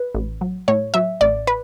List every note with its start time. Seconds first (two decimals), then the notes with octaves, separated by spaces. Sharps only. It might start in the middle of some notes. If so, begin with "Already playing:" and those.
Already playing: B4
0.15 A1
0.41 F#3
0.68 A2 C#5
0.94 F#3 E5
1.21 A1 D5
1.47 B4